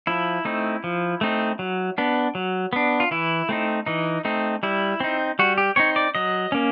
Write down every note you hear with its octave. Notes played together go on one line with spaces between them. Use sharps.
F3 E4
A3 C4 D#4
F3
A3 C4 D#4
F#3
B3 D4
F#3
B3 D4
F4
E3 E4
A3 C4 D#4
E3 D#4
A3 C4 D#4
G3 E4
C4 D#4
G3 F#4
G4
C4 D#4 C#5
D5
F#3 D#5
A#3 C#4